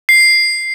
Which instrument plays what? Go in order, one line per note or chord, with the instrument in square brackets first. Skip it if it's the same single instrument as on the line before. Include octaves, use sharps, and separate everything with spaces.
[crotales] C7